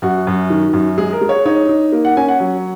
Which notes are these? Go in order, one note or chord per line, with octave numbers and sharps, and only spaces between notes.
F#2 F#4
F#2
D#3
F#2
G#3 G#4
A#4
G#3
C#5
D#4 C#5
D#4
A#3
F#5
C#4 G#5
F#5
F#3